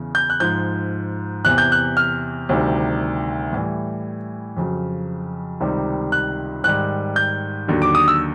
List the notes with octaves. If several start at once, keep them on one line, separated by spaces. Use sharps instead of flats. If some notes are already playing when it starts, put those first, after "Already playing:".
Already playing: E2 C#3 E3
G6
F#6
G#2 F3 G6
E2 C3 E3 F#6
G6
F#6
F6
D2 C3 D#3 G3
A2 E3 G3
F2 C#3 F#3
C#2 C3 D#3 G3
F#6
G#2 D#3 G3 F#6
G6
D#2 D3 F#3
D6
D#6
E6